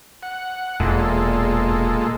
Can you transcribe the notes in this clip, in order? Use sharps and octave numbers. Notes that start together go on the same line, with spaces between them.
F#5
E1 E2 A#2 G#3 A4